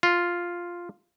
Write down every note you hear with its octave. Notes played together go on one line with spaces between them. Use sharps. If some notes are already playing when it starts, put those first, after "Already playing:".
F4